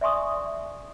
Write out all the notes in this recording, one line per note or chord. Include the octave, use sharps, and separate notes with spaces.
D5 E5 G#5 C6 C#6 D#6